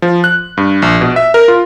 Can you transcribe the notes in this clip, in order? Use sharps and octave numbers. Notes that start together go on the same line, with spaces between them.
F3
F#6
G2
A#1
B2
E5
A#4
F4